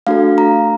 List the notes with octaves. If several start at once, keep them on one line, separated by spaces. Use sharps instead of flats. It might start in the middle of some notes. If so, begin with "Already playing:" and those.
A3 D4 F#4 A4 F5
A#5